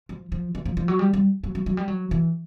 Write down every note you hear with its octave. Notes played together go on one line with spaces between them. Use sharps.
F3
F3
E3
F3
F3
F#3
G3
G3
F#3
F#3
F#3
G3
F#3
E3